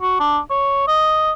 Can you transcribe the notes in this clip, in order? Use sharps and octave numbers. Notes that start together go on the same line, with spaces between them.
F#4
D4
C#5
D#5